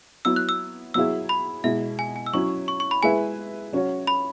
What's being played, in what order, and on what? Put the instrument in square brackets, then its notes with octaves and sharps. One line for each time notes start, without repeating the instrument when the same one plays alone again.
[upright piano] F#3 B3 E4 [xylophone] E6
[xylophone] F#6
E6
[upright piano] F#3 B3 E4 G#4 E5 [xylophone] E6
[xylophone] B5
[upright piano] B2 G#3 E4 [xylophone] E5
[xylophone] G#5
G#5
E6
[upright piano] F#3 C#4 E4 [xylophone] C#6
[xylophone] C#6
C#6
B5
[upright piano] G#3 E4 G#4 B4 E5 [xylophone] G#5
[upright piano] F#3 C#4 F#4 C#5
[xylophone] B5